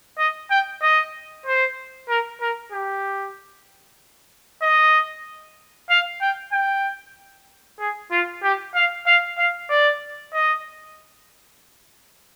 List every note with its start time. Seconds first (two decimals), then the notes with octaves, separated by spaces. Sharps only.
0.19 D#5
0.51 G5
0.82 D#5
1.46 C5
2.09 A#4
2.41 A#4
2.72 G4
4.62 D#5
5.90 F5
6.22 G5
6.52 G5
7.80 G#4
8.12 F4
8.43 G4
8.75 F5
9.07 F5
9.38 F5
9.69 D5
10.34 D#5